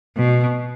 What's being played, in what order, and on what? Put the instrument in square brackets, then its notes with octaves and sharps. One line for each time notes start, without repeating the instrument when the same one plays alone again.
[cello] B2